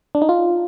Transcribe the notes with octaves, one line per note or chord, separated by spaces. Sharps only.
D4
D#4
F4